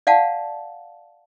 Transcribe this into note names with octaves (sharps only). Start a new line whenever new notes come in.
D5 F5 F#5 A5